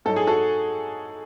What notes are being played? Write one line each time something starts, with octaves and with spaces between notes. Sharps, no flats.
G#2 F#3 A4
G#4
F#4 A4